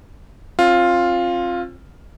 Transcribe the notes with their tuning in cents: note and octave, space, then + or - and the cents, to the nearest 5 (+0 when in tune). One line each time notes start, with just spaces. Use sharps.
C4 +40 F4 +5